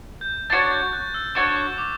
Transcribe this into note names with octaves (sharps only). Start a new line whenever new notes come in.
G6
D4 F#4 C#5 A6
G6
F#6
E6
D4 F#4 C#5 C#6
C#6
D6